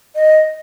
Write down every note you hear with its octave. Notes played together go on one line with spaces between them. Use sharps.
D#5